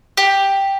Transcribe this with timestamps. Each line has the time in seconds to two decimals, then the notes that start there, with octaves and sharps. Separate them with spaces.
0.17 G4